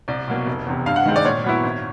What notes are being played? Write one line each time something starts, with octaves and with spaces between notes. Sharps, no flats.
C2 D5
B2 F#3 A#3
F1
E2 C3
G2 F5
F#5
D#3 G#3 C4
D5
A#2 C#5
F#3 B3 E4
G#1